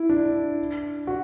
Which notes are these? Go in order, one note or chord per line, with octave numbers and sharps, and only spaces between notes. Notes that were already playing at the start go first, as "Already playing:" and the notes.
Already playing: E4
D4
F#4